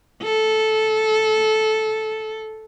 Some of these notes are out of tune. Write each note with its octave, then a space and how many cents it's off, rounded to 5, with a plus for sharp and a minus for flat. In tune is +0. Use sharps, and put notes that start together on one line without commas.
A4 -10